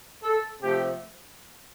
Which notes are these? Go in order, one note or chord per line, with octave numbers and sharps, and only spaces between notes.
A4
C3 F3 A3 G4